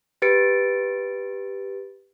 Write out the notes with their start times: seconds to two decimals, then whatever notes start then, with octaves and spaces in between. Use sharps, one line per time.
0.22 G4 B4 A6 C#7 D7